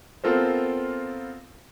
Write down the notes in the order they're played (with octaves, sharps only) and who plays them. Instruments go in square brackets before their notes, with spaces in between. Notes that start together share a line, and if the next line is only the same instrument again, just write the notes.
[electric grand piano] B3 C4 F4 A4 A#4 C5